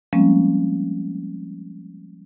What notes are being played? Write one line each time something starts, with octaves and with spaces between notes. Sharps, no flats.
F3 G3 G#3 A#3 C4 C#4